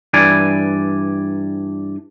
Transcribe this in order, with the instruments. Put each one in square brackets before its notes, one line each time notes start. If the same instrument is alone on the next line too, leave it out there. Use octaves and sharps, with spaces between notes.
[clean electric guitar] G2 E3 D5 G#5